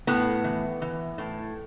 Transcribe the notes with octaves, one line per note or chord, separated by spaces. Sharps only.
A2 B3
E3
E3
A2